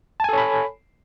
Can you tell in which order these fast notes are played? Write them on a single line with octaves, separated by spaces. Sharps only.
A5 G#5 A4 C#5 B5